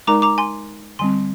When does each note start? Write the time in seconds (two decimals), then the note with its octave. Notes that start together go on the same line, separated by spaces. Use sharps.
0.07 G#3 D#4 A#4 D5 A#5 D6
0.22 A#5 D6
0.38 G#5 C6
0.99 D3 G3 C4 G#5 C6